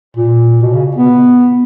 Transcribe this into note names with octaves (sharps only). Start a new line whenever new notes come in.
A#2
B2
C#3
B3